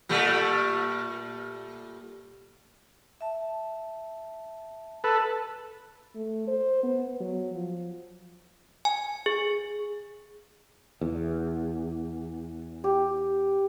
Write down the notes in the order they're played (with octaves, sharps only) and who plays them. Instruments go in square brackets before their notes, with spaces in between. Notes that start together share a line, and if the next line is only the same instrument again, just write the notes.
[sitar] A#2 G3 A3
[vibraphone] E5 A5
[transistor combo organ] A4 B4
[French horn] A3
C5
B3
F#3
F3
[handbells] G#5
G#4
[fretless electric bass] E2
[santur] G4